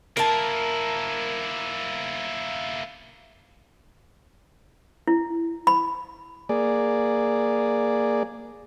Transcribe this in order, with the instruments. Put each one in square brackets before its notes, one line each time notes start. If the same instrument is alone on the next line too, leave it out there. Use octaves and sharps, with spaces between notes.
[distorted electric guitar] A#3 E4 [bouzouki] A#4 A5
[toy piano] E4
B5
[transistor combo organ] A#3 G#4 D5